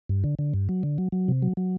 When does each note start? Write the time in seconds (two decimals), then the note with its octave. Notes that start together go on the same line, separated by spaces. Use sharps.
0.09 G2
0.24 D3
0.39 D3
0.54 G2
0.69 F#3
0.83 D3
0.98 F#3
1.12 F#3
1.28 C3
1.42 F#3
1.57 F#3